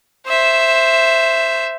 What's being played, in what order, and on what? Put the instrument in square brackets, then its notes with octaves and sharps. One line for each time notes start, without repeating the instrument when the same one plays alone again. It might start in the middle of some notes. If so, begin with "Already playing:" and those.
[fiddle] C5 E5